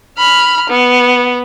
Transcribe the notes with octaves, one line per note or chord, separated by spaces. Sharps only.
B5 F6
B3